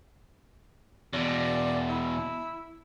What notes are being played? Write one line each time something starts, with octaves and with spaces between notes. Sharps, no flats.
E2 B2 D5
E4